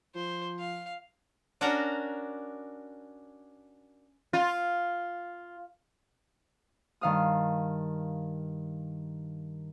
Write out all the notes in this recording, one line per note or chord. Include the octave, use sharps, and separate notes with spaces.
F3 C5
F5
C#4 D4 F#4 A#4 F#5 A#5
F4
G2 D#3 F5 D#6